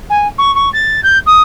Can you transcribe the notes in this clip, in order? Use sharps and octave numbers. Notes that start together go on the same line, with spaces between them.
G#5
C#6
C#6
A6
G6
D#6